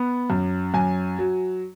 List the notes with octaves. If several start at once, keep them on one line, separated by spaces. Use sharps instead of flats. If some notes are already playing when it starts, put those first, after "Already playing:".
Already playing: B3
F#2
F#2 G#5
F#3